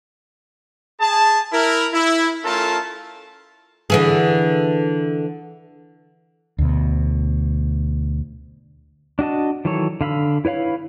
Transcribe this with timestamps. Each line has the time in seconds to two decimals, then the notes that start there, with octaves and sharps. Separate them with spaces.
1.00 G#4 A5
1.52 E4 A#4
1.93 E4
2.44 A3 C#4 F4 A4 A#4 A5
3.90 D3 E3 G#4
6.58 D2 B2
9.19 D4 F#4 D#5 A5
9.65 D#3 E3 F#3 A4 C#5
10.01 D3 F5 B5 E6
10.45 E4 B4 C#5 F5 B5